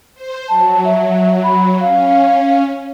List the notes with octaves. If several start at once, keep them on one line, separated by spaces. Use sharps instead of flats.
C5
F#3 A5
E5
B5
C#4 F5